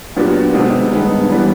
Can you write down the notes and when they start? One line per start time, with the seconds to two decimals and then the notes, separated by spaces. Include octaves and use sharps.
0.17 A#2 F#3 B3 D4 G4
0.54 C3 D#3 G#3 B3 D#4
0.92 G2 D#3 G#3 B3 D#4
1.29 E3 G3 B3